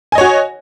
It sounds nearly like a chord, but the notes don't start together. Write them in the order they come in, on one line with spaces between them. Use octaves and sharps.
G#5 D#5 C#5 F#4